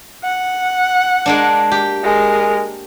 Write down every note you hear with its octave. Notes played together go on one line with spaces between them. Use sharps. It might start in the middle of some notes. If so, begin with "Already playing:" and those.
F#5
G#3 A#3 D4
G4
G#3 A#4